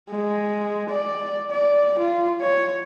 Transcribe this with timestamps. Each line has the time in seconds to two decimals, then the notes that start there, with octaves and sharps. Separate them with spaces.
0.10 G#3
0.90 D5
1.50 D5
1.99 F4
2.41 C#5